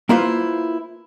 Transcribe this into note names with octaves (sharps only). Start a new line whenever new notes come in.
A#3 E4 F4 B4 C5